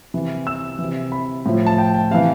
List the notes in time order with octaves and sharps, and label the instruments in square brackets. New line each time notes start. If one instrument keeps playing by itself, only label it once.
[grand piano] C3 E3
E6
E3
C3
B5
A2 F3
A5
G5
G5
C3 E3 F5